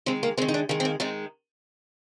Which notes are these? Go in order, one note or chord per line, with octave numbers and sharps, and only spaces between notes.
D#3 G#3 C4
A#3
D#3 G#3 C4
D#4
D4
D#3 G#3 C4
C4
A#3
D#3 G#3 C4